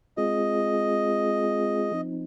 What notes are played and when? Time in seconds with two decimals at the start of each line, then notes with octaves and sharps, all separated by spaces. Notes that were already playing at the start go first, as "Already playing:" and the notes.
0.17 G#3 C4 F4 G#4 D#5
1.92 F3 C4 D#4